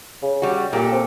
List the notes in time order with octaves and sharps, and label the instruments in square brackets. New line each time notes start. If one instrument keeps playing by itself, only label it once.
[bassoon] C#3
[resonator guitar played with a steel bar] G3 F#4
[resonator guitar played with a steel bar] A#2 G4 A4 [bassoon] A#3
[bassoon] C4